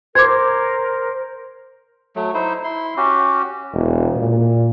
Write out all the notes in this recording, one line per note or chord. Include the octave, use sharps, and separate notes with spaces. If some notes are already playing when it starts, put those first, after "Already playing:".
A#4 C5 D6 G#6
F#3 A3
D#4 E4 C5
E4 C6
C#4 F#4 G4
E1
A#2